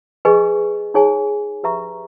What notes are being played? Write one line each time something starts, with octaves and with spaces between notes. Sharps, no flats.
G#4 B4 D#5 G#5 C#6
D#4 G#4 C#5 G#5
G4 B4 E5 A#5 C#6